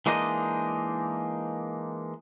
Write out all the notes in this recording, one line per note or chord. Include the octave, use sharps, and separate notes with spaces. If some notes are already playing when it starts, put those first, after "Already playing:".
E3 G#3 A#3 D4 D#4 D#5